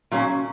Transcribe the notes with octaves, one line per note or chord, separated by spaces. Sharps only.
A#2 F#3 A#3 C#4